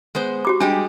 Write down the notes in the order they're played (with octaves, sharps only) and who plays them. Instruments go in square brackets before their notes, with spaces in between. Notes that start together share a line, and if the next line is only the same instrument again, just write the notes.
[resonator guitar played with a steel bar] G#3 B3 C5
[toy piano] F#4 G4 D6
[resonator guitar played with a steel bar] G3 G#3 G4 [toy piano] D4